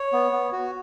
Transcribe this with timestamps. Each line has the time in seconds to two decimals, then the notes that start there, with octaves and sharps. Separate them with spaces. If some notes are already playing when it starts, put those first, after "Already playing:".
Already playing: C#5
0.12 B3
0.32 B3
0.52 F#4